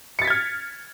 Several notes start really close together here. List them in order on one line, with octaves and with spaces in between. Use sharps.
C#7 A6 B6 G#6 F6